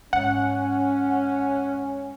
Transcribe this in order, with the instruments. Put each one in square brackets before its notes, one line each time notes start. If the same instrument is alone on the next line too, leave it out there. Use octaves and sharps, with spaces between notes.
[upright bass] G#2 [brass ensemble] C#4 [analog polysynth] F#5